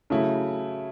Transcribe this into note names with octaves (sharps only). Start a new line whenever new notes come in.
C#3 F#3 A3 E4